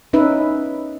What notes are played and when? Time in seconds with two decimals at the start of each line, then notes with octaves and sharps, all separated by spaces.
0.13 C#4 D#4 B4 E5